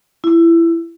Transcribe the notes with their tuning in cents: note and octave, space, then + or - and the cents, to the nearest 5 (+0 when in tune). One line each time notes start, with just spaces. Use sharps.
E4 +20